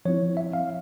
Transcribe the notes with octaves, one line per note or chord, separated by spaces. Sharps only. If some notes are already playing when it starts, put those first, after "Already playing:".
F3 C4 E4 C#5
E5
F5